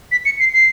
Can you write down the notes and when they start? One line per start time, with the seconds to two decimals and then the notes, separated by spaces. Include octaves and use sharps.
0.12 B6
0.25 C#7
0.40 C7
0.53 C7